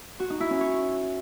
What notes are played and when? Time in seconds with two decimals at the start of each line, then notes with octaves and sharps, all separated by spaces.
0.20 F#4
0.30 D#4
0.40 E4
0.50 C#4
0.61 C#5